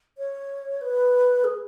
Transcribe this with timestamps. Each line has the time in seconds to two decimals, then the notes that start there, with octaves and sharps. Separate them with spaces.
0.18 C#5
0.81 B4
1.44 G#4